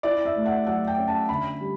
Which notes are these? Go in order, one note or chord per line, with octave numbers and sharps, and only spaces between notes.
E4 D5
E5
A3
F#5
F#3 F#5
G5
C#4
A5
D3 B5
G3